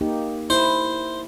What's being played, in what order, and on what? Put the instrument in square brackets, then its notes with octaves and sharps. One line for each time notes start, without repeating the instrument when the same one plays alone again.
[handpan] A#3 D#4 G4
[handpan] E4 [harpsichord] C5